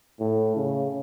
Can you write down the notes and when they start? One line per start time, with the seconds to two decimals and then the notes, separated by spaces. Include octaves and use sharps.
0.20 A2
0.56 C#3